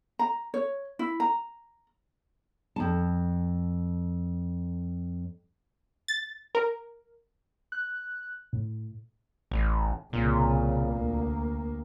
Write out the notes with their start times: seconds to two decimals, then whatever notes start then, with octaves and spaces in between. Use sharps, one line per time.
0.19 A#5
0.54 C#5
0.99 E4
1.20 A#5
2.76 F2 A5
6.08 A6
6.55 A#4
7.72 F#6
8.53 A2
9.51 A1
10.13 C2 A#2 C#3
10.91 D2 A#3